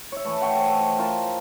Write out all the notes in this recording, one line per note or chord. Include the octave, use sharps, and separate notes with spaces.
C#5 E5
E3 A3
F#5 G5 C#6
A4 C5
F4 A#4 C5 A5